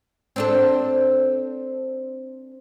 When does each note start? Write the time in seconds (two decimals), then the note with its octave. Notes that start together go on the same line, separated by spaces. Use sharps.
0.36 C4 D4 A4